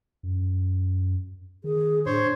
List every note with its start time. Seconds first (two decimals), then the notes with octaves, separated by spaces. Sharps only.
0.23 F#2
1.64 D#3 G#4
2.06 A2 D4 C5 C#5 C6